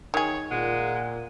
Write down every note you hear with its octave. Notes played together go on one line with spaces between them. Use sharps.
D#3 G#4 C#5
A#2 G#3 F#5